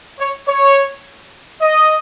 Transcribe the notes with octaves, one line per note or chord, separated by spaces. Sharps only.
C#5
C#5
D#5